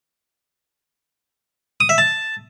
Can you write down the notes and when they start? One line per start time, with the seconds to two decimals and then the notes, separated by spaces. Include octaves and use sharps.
1.81 D#6
1.89 E5
1.98 A5